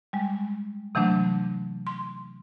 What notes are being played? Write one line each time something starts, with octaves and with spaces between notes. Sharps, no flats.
G3 G#3
C3 E3 F#3 A3 D4
C6